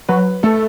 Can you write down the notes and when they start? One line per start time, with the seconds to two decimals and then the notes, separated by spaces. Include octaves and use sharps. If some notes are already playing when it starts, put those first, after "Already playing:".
0.09 F#3 B4
0.43 A3 A4